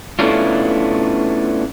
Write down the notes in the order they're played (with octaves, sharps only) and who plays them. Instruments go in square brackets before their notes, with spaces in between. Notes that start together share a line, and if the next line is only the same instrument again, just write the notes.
[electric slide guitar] A3 B3 C#4 D4 E4 F4